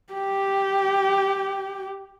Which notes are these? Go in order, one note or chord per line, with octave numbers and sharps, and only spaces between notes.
G4 G5